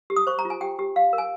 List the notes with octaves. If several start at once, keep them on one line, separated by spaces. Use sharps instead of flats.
G4
D#6
C5 C#6
A#5
F4
G#5
G4 G5
G4
G4 F5
A#4
G#5